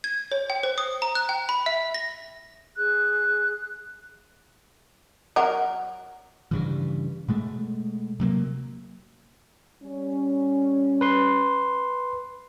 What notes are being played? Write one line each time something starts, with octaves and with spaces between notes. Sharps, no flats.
G#6
C#5
G5
C5
D#6
A#5
F#6
G5
B5
E5
A#6
G#4 F#6
F#3 A#4 F#5
G2 C#3 E3
B2 G#3 A3
C3 F#3 A#3
G3 C#4
B4 C6